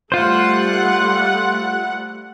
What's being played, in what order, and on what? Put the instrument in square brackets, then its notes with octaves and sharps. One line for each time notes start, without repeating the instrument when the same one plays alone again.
[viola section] G3 A3 F#5 [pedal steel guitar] F4 C5